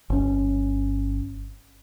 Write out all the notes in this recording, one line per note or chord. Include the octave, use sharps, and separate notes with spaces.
G1 C#4